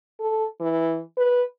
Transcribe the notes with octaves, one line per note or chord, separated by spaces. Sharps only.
A4
E3
B4